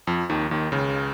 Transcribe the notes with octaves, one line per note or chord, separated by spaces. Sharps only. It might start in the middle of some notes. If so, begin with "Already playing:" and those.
F2 F3
D#2 D#3
D#2 D#3
C#2 C#3